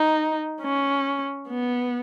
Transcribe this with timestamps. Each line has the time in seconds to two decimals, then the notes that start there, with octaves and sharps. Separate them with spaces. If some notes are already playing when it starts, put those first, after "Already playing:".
Already playing: D#4
0.62 C#4
1.48 B3